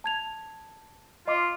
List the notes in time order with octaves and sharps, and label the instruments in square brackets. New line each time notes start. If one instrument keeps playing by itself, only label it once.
[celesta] A5 G#6 F7
[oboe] F4 [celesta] D#5 C6 D6